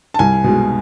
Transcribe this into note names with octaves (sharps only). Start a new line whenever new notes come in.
A5
C2 G#5
B2 G#3